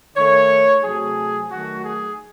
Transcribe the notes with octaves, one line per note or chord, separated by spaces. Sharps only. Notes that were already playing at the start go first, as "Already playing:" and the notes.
D#3 A3 C#5
C3 F#3 A3 G#4
D#3 F#3 A3 F#4
G#4